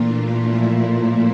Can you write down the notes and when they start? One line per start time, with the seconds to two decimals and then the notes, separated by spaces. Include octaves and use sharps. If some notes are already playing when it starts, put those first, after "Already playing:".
Already playing: A#2 E3 A3 D4 F4
0.46 A2 F3 A3 E4